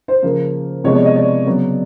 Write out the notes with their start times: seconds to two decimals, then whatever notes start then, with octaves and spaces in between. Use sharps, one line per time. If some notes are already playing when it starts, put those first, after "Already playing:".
0.08 C5
0.22 C#3 F3 A#3
0.84 C3 F3 G#3 B3 C#5
0.95 D5
1.05 D#5
1.16 D5
1.46 C#3 F#3 B3